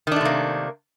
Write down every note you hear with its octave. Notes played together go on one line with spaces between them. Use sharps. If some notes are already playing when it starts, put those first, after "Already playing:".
C3 D#3 A3 A#3 D4